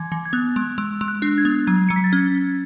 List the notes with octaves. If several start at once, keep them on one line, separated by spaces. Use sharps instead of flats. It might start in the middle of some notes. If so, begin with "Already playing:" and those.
Already playing: E3 G#6
E3
G#6
B3 F#6
G#3
G#3 E6
G#3
F#6
D4
G#6
B3
F#3 G#6
F#3 C#7
B6
A6
C#4 G#6